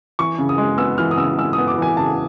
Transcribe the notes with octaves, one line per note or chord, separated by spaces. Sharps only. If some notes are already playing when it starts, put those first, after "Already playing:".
E3 C#6
C#3
D#6
G#3
B3 E6
E3 F6
D#6
C#3 E6
G#3 E6
D#6
B3
D6
E3 G#5
C#3 A5